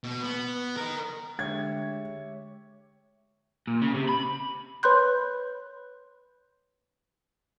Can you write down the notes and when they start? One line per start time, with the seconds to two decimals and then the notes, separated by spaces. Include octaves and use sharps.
0.04 B2
0.23 B3
0.77 A#4 D#5
1.39 D3 G#3 A3 G4 C#5 E5 G#6
3.67 A#2
3.82 C#3
3.95 C3
4.09 B5
4.83 B4 C#5 B5 C6 F#6 G6